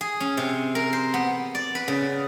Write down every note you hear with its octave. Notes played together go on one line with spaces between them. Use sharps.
G#4
C#4
C3
A#4
C5
B3
D5
B4
C#3